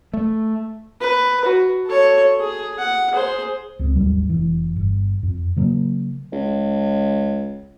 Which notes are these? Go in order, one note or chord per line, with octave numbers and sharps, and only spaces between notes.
A3
B4
F#4
A4 C#5
G#4
F#5
G#4 C5
C#2 C4
G#1 D#2 F#3 G3
F1 E3
G1
F2
C#3 F#3 A#3
C#2